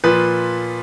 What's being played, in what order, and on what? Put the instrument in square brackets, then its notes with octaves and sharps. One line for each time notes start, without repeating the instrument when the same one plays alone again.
[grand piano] A#2 F3 B4